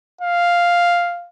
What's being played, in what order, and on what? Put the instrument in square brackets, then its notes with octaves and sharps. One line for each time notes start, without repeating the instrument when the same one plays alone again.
[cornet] F5